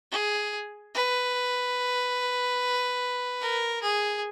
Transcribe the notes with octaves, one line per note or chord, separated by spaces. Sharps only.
G#4
B4
A#4
G#4